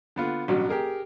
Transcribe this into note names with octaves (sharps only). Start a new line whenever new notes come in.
D3 B3 F4
A1 G2 B2 F#3
G4 G#4 A#4